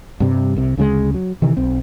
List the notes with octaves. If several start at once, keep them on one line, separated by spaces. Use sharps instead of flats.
G2 C3 G3
C2 C3
D2 C#3 E3 G#3
F#3
C3 D#3 E3
B1 C4